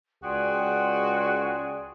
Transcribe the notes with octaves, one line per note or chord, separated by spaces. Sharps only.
C#2 F#4 G#4 D5 G5 C6